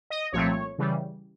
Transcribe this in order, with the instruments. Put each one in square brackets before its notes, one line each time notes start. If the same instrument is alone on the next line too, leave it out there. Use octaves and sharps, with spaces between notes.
[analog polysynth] D#5
C2 A#2 F3 A3 C4 C#5
C#3 E3 G3